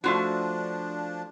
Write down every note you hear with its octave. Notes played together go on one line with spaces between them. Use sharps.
F3 A3 D4 F4 F#4